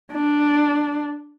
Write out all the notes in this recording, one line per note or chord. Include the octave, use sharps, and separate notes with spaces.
D4